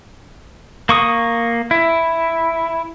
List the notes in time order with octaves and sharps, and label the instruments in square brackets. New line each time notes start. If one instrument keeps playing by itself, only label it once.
[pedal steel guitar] A#3 C#6 D#6
E4